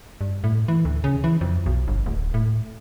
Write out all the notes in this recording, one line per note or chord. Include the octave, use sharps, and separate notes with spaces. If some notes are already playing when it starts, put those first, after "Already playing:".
G2
A2
E3
D2
C#3
E3
F2
B1
G1
D1
A2